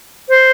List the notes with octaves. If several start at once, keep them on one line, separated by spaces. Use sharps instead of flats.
C5